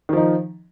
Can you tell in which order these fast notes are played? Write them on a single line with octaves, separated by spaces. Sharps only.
D#3 F3 D#4